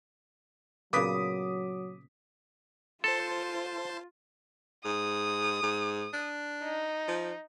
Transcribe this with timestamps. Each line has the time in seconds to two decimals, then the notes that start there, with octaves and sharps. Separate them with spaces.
0.93 A#2 C#3 F#3 B3 D6 D#6 B6
3.04 F4 A4 C5 A5 C6
4.85 G#2 D#6
5.63 G#2
6.13 D4
6.63 D#4
7.08 F3